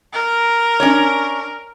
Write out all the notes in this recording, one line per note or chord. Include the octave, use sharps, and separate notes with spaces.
A#4
C#4 D4 C#5